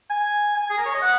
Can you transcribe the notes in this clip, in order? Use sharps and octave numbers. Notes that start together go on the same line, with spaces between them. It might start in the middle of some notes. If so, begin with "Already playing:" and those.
G#5
G#5
G#4
A#4
C#5
D#5
F#5